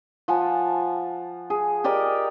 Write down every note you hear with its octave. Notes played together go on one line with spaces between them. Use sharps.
F3 F#5 G#5
G#4
G4 A#4 D5 D#5